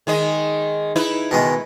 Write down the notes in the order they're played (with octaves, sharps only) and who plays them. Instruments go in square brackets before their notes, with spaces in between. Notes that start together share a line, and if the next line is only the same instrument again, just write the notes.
[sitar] D#3 G#3 D#5
D#4 E4 B4
[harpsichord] B2 D#3 G#3